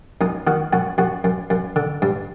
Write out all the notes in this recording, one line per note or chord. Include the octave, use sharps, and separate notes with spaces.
F#2 D#4
D#3 F#4
F#2 F#4
F#2 F#4
F#2
F#2
D3
G2